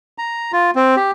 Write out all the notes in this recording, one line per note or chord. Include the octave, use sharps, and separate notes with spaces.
A#5
F4
C4
G4